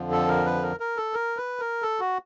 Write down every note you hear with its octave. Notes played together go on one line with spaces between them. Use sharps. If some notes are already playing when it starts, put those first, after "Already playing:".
Already playing: F2 D3 F3
A4
A#4
B4
A#4
A#4
A4
A#4
B4
A#4
A4
F#4